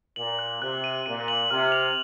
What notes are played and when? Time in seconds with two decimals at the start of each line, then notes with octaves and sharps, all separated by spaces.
0.16 A#2 F#7
0.39 F#6
0.61 C3 F#6
0.84 D#7
1.06 A#2 D#7
1.28 F#7
1.51 C3 F6
1.72 F7